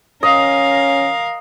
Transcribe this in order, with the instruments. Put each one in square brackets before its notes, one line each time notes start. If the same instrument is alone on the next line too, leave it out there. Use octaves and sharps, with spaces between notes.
[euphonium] C#4 [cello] A#4 F5 [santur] D#5